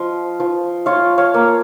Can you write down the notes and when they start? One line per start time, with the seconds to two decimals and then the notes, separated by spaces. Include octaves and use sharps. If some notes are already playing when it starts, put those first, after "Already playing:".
Already playing: F3 F4 D#5
0.40 F3
0.86 F4 C#5 F5
1.18 C#5 F5
1.34 A#3